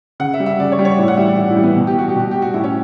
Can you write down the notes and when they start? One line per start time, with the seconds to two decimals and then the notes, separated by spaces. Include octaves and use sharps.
0.20 C#3 F#5
0.34 E5
0.40 G3
0.46 E5
0.59 C#3 D5
0.72 C#5
0.79 G3
0.85 C#5
0.99 A2 D5
1.08 F#5
1.17 E3 G3 E5
1.28 D5
1.37 A2 E4
1.50 E4
1.57 E3 G3
1.63 B3
1.76 B2 F#4
1.87 G4
1.96 G3 F#4
2.09 G4
2.15 B2 F#4
2.31 G3 G4
2.42 F#4
2.54 A2 E4
2.64 C#4